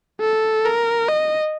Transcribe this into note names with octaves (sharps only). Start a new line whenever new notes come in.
A4
A#4
D#5